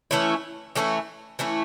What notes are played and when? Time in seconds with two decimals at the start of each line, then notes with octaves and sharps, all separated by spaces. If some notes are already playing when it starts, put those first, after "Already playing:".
0.11 E3 A3 C#4 E4
0.75 E3 A3 C#4 E4
1.39 E3 A3 C#4 E4